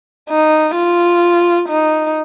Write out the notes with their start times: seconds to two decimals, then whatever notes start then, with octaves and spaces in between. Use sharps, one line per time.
0.29 D#4
0.75 F4
1.69 D#4